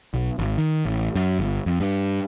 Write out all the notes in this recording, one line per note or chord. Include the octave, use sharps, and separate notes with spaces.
B1
G#1
D#3
A1
F#2
G1
F2
G2